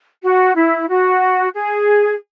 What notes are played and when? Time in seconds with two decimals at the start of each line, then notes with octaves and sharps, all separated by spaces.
0.22 F#4
0.55 E4
0.88 F#4
1.55 G#4